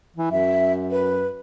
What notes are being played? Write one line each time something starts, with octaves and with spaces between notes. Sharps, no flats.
E3
F#2 E5
B4